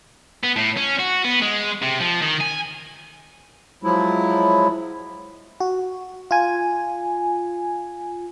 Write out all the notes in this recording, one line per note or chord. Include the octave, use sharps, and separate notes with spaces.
B3
A2
C#4
F#4
B3
G#3
C3
F3
D#3
G#5
F3 F#3 G#3 E4
F#4
F4 G#5